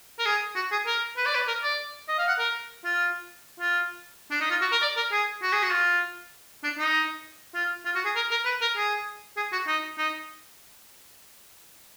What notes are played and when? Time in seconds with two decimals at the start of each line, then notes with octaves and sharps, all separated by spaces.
0.19 A#4
0.26 G#4
0.56 F#4
0.72 G#4
0.86 A#4
1.17 B4
1.26 D5
1.35 B4
1.47 A#4
1.63 D5
2.08 D#5
2.18 F5
2.28 F#5
2.39 A#4
2.84 F4
3.60 F4
4.31 D4
4.41 D#4
4.50 F4
4.61 F#4
4.72 A#4
4.82 D5
4.97 A#4
5.12 G#4
5.42 F#4
5.52 G#4
5.63 F#4
5.72 F4
6.64 D4
6.78 D#4
7.55 F4
7.85 F4
7.95 F#4
8.05 G#4
8.16 A#4
8.31 A#4
8.45 B4
8.61 A#4
8.77 G#4
9.37 G#4
9.52 F#4
9.67 D#4
9.98 D#4